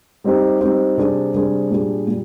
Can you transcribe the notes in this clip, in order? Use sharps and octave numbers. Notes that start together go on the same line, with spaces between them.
G3 C4 D#4 G4 C5
G3 C4 D#4 G4 C5
C3 G3 D4 G#4 C5
C3 G3 D4 G#4 C5
A#2 G3 D4 G#4
A#2 G3